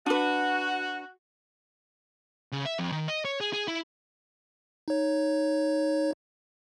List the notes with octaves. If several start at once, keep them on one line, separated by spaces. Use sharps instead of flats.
D4 F#4 B4
C#3
E5
F2
D#3
D#5
C#5
G#4
G#4
E4
D#4 C#5